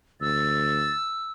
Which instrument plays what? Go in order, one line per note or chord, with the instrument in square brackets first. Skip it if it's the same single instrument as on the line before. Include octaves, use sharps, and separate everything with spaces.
[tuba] D2 [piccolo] E6 [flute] A6